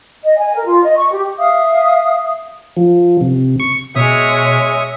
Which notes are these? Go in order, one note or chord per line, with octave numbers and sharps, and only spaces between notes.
D#5
G#5
A#4
F4
D#5
C#6
G4
E5 F5 D#6
F3
C3
C#6
B2 G#3 C#5 E5 D#6